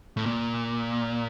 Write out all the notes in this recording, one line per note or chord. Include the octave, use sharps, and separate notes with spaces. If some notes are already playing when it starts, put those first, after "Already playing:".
A2
A#2